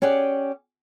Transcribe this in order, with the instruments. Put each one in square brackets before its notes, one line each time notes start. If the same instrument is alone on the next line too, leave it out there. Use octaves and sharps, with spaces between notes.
[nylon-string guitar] C#4 G4 G#4 D5 F#5